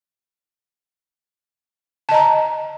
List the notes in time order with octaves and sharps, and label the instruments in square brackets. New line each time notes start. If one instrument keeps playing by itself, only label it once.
[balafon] A5
D#5
A#5